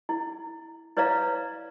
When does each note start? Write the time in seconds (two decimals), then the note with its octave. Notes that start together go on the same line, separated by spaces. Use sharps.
0.09 E4
0.97 E4 B4 C#5 D5 F5 A#5